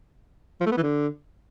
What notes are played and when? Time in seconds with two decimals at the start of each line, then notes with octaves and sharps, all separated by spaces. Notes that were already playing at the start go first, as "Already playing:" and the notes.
0.61 F3
0.66 A3
0.72 B3
0.77 E3
0.83 D3